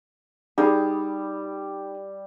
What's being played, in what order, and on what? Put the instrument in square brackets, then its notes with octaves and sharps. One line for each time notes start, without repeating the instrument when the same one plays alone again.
[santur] G3 [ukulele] D#4 G#4